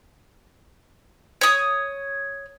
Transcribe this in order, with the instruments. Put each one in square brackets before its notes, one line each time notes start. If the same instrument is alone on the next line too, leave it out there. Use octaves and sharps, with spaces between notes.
[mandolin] C#5 D#6